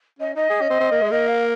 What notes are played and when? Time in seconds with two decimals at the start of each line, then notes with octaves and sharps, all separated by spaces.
0.19 C#4 D#5
0.35 D#4 D#5
0.50 G#4
0.61 C#4
0.70 C4
0.80 C4
0.92 A#3
1.02 G#3
1.11 A#3 D#5
1.27 F5